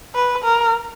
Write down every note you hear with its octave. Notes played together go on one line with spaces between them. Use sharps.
B4
A#4